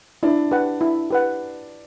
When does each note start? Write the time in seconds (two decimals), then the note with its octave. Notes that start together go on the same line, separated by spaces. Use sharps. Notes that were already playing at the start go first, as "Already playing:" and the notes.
0.23 D4 E4
0.51 G4 B4 F#5
0.81 E4
1.10 G4 B4 F#5